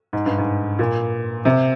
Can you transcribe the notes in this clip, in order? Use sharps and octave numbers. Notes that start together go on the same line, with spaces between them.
G#2
G2
G#2
A#2
C3